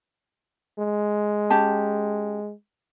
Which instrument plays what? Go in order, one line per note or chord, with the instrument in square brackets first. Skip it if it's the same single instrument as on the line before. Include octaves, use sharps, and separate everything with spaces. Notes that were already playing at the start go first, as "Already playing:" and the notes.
[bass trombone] G#3
[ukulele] C#4 G4 A5